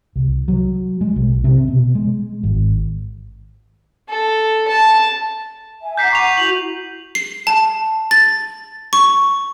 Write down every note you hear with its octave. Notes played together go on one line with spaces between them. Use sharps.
C2
F#3
G#3
B1
C3
B2
G#3
G#1
A4
A5
E5 G#5
F#5 A#5 D6 G6 B6 C7
C#6 F7
E4 F#4 F#7
C7
A5
A6
C#6